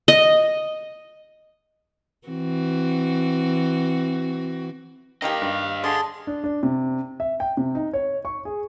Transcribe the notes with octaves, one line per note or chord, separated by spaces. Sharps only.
D#5
E3 C4 F#4
D#3 D#4 G4 D#5 F5
G2
D3 G#4 D5 C6
D4
D4
C3
E5
G5
C3
D#4
C#5
C#6
G#4